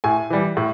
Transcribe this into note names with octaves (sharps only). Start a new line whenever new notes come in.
A2 G#5
E3 G3
A2